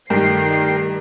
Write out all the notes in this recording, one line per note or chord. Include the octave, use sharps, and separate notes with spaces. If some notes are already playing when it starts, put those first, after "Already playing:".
G2 D#3 A3 A#4 G5 C7